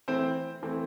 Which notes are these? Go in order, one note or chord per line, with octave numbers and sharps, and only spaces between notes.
E3 A3 C4 C5
E3 A3 C4